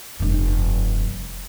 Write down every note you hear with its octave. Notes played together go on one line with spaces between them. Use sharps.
F1 G2